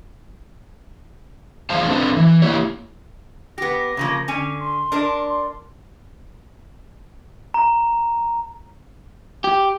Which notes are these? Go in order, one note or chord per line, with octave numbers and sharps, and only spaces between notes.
E2 G#3 C5 F5 A5
C4 D4 A4 B4
E3
A#3 E4 G4 C#5
B3 G4 A#6
C#3 F3 A#3
D3 C#4 G#5
C6
D4 A#4 A5
C6
A#5
G4